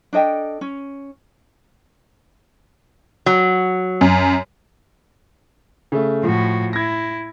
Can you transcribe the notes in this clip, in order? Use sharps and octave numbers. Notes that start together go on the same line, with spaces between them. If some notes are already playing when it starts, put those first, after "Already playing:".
D4 A4 D#5 G5
C#4
F#3
F#2
C#3 A3
A2 F3 F#4
E4 G#6 A#6